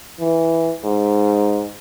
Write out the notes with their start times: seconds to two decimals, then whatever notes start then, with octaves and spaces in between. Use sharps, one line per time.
0.20 E3
0.84 G#2